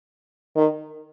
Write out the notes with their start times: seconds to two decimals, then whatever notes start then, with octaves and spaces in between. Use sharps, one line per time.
0.56 D#3